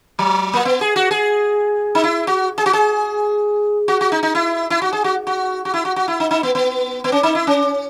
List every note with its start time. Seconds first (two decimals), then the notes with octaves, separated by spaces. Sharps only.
0.19 F#3
0.53 A#3
0.65 B3
0.81 G#4
0.96 F#4
1.11 G#4
1.95 D#4
2.04 E4
2.27 F#4
2.58 G#4
2.66 F#4
2.73 G#4
3.88 F#4
4.01 F#4
4.12 D#4
4.23 D#4
4.35 E4
4.70 E4
4.82 F#4
4.93 G#4
5.04 F#4
5.27 F#4
5.65 F#4
5.74 E4
5.85 F#4
5.96 F#4
6.08 E4
6.20 D#4
6.31 D#4
6.43 B3
6.55 B3
7.04 B3
7.12 C#4
7.23 D#4
7.35 E4
7.47 C#4